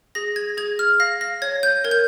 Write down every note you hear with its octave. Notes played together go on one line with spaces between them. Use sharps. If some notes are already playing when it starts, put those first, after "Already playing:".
G#4 A#6
G#6
G#4 G#6
F6
F5 A#6
A#6
C#5 G#6
G6
A#4 G#6
G6